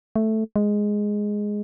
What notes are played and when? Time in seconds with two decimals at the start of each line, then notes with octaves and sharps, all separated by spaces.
0.16 A3
0.56 G#3